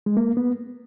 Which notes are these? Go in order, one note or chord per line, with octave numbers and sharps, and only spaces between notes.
G#3
A#3
B3